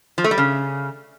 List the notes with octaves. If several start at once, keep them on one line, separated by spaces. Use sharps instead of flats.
F3
A3
G3
C#3